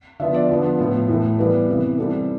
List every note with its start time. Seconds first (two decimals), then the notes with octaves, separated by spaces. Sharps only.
0.20 D3 F3 B3 E5
0.34 D5
0.49 D3 F3 B3
0.79 A2 F3 B3
1.09 A2 E3 A3
1.38 E3 G3 B3 B4
1.68 C3 E3 B3
1.98 E3 G3 C4 A4